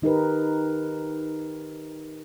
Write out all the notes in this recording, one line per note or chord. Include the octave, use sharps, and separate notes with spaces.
D#3 D#4 G4 A#4 B4